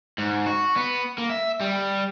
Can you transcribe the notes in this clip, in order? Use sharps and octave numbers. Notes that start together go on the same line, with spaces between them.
G#2
F#4
B3
A#3
E5
G3